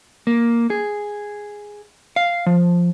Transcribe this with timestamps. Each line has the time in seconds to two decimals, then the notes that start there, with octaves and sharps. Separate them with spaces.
0.27 A#3
0.70 G#4
2.16 F5
2.46 F3